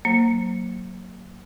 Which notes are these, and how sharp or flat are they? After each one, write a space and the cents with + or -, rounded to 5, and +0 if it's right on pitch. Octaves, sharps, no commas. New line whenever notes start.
F#3 +0 A#3 -10 C5 +20